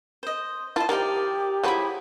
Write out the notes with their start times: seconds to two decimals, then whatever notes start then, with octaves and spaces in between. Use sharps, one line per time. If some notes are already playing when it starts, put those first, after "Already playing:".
0.23 C5 D#5
0.76 E4 F4 C5 D#5 A5
0.89 D#3 F3 G4 A#4 D5 D#5
1.64 F3 F#3 G#3 E4 B5 D#6